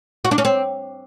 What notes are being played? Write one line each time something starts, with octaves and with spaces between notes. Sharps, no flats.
F#4
D4
C#4
C4